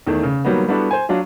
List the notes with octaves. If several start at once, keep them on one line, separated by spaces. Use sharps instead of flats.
E2 D#3 A3
C#3
D#3 F#3 G3 A#3 B3
G3 B3 D4 E4 F#4 A4
C5 G#5
F#3 D4 F4